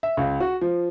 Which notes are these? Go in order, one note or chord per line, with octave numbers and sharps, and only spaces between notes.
E5
C#2
F#4
F3